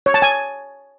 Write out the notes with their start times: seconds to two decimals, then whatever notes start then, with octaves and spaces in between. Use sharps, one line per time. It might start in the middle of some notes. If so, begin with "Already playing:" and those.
0.06 C#5
0.14 A5
0.22 G#5